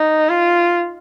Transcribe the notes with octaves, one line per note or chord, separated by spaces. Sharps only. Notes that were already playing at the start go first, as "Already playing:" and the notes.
Already playing: D#4
F4